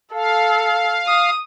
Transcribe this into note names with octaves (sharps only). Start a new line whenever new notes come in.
A4 F5
D#6